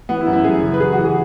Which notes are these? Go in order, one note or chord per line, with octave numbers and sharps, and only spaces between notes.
E3 B3
E4
F#2
E4
F#2 G#4
C#3
B4
E3 G#4
F#4
E3
G#4